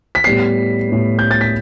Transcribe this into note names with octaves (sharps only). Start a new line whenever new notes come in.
B6
A2 G3 B3 C7
A2 G3 B3
G6
A6
B6